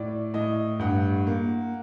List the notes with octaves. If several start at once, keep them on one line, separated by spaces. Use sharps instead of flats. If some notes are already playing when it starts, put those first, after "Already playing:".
Already playing: A2 D5
A2 D#5
G2 F#5
A#3